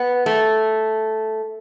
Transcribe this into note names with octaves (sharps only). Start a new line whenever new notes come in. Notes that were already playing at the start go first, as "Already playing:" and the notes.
Already playing: B3
A3